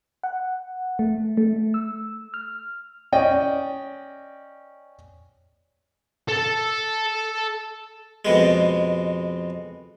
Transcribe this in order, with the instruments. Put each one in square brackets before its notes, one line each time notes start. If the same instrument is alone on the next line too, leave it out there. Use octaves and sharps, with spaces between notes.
[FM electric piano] F#5
A3
A3
E6
F6
[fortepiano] C#4 D5 D#5 G5
[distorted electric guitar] A4 A5
[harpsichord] F2 B2 G#3